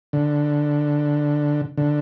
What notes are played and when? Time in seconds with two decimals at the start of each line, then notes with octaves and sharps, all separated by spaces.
0.13 D3
1.77 D3